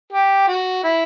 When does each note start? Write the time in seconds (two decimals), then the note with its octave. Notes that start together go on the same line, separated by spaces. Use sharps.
0.13 G4
0.48 F#4
0.84 E4